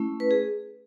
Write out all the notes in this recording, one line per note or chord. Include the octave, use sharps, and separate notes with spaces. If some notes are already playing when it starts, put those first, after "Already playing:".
Already playing: A3 C#4 E4
B4
G#4